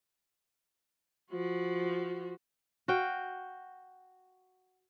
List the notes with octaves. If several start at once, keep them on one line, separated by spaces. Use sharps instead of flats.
F3 F#4
F#4 F5 G5